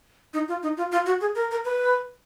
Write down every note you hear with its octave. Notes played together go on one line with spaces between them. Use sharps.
D#4
F4
D#4
F4
F4
F#4
G#4
A#4
A#4
B4